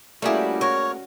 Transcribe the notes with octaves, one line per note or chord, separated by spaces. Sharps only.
G3 A3 A#3 C#4 E4 F#4 G#4
A#4 C#5